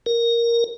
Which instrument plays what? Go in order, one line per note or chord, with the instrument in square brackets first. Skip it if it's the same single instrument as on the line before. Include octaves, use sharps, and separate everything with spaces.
[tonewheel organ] A#4